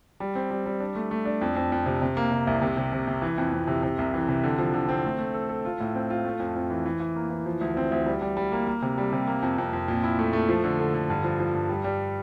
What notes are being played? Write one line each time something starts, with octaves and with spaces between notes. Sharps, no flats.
G3
C4
G3
G3
D4
A3
A3
D4
F2
F2
F2
C3
C3
A#3
C3
C2
C3
C3
C3
C3
E3
F2
F2
C3
C3
C2
E3
C3
D3
F3
D3
C4
A3
A3
A4
A4
F4
A2
C4
F4
A3
F2
F2
E3
E3
E3
A#3
E3
F3
D2
C4
D2
G3
G3
G3
A#3
A#3
C3
G3
C3
A#3
F2
F2
F2
A#2
E4
A3
A3
F3
D3
D3
D3
G2
F3
F3
G2
G3
G3